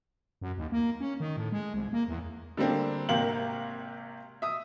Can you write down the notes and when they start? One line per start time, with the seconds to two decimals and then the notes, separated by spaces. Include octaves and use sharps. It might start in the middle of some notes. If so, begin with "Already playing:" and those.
0.41 F#2
0.57 D#2
0.72 A#3
1.00 C#4
1.20 D#3
1.37 A2
1.52 G#3
1.74 C2
1.93 A#3
2.08 E2
2.57 D3 G3 A#3 C4 D4
3.09 G#1 C3 A#3 G4 F5 F#7
4.42 E5 D#6